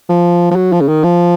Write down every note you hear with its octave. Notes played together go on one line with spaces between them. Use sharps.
F3
F3
F#3
F3
C#3
D#3
F3